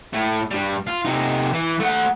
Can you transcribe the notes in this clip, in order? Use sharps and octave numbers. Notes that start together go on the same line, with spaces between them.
A2 A3
G2 G3
F4
C3 D#4
E3
A3 F#5